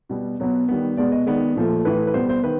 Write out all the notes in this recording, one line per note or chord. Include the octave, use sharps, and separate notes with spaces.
B2 G3 B3
B2 F#3 B3
D#3 G3 B3
B2 G#3 B3 D5
D#5
D#3 G#3 B3 D5
A#2 F3 A3
A2 E3 A3 B4
B4
B2 G3 B3 C5
C5
D#3 B4